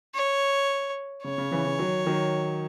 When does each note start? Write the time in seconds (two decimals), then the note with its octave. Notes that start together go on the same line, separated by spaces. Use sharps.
0.15 C#5
1.24 C#3 C#5
1.38 C#3
1.51 C#3 E3
1.65 C#3 E3
1.79 D#3 F#3
2.06 D#3 F#3